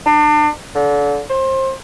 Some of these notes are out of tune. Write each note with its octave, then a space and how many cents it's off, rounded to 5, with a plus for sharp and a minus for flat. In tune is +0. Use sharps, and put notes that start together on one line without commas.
D4 +35
D3 -30
C5 +25